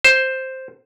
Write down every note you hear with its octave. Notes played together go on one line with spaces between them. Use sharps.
C5